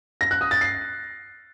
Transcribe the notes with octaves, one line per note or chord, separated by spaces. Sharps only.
A#6
F#6
D#6
A6
C7